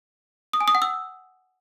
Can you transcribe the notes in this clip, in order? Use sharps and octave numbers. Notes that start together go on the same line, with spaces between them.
D#6
G#5
D#6
F#5
E6